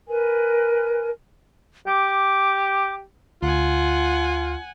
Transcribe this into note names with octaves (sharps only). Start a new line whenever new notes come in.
A#4 B4 G#5
G4 D6
D2 F4 F#5 G#5